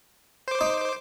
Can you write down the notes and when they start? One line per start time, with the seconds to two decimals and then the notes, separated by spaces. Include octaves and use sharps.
0.48 C5 D6
0.61 D#4